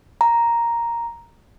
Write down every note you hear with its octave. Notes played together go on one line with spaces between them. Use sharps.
A#5